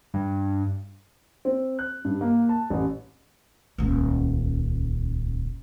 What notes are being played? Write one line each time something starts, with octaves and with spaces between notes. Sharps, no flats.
G2
C4
F#6
G2
A#3
A5
A1
D#1 C#2